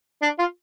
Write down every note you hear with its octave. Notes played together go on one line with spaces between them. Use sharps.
D4
F4